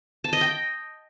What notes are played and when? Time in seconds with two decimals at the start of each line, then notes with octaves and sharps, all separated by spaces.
0.24 A5
0.33 D#5
0.41 G5